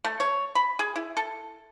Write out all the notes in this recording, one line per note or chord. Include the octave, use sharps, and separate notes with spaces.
A3
C#5
B5
G#4
E4
A4